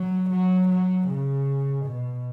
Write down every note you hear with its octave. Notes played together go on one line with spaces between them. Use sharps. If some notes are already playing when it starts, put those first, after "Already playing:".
Already playing: F#3
F#3
F#3
C#3
B2